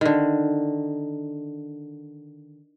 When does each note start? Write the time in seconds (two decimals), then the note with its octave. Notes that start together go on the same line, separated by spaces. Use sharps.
0.01 D3 D#3